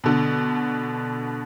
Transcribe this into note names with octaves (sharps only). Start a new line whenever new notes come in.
B2 D3